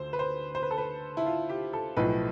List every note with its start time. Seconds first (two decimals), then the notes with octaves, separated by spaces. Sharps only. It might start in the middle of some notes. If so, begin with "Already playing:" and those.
Already playing: D2 D3 C5
0.13 B4
0.19 C5
0.55 C5
0.63 B4
0.71 A4
0.78 B4
1.17 E4
1.26 F4
1.49 G4
1.73 A4
1.97 B1 A2 F3 B4